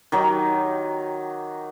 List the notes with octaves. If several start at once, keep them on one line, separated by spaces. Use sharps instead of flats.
D#3 F#3 D#4 G4